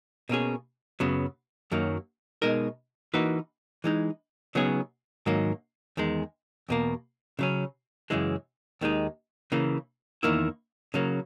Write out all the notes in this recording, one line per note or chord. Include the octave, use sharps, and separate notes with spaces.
B2 A#3 C#4 G#4
F#2 C#3 F#3 B3
F#2 D#3 F#3 A#3
B2 G#3 D#4 A#4
E3 A#3 D#4 F#4 B4
E3 G#3 D#4
C#3 F#3 B3 D#4 G#4
G#2 D#3 F#3 A#3
E2 D#3 G#3
E2 B2 A#3
C#3 F#3 C#4
F#2 C#3 E3 G#3
D#2 D#3 G#3 D#4
C#3 E3 A#3
E2 D#3 A#3 E4
C#3 F#3 A#3